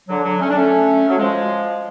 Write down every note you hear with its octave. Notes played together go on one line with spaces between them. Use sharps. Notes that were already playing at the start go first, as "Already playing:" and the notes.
D3 F#3
D3 F#3
A3 C#4
D4
A3 C#4
F#3
F3 G#3